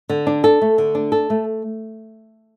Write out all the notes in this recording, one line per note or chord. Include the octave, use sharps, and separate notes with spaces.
D3
D4
A4
A3
D3
D4
A4
A3